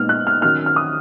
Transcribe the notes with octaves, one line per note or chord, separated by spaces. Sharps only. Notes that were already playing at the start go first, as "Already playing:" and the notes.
Already playing: A#2 G#3 B3 D#4 F6
F#6
F6
D#3 F#3 C#4 F6
F6
D#6